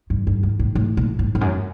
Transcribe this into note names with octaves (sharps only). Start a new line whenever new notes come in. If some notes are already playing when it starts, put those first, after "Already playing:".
G2
G2
G#2
A2
A2
A#2
A2
F2
F#2